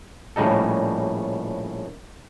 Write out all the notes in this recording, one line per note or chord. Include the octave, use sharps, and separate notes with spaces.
A#1 A2 C#3 G3 D#4 A4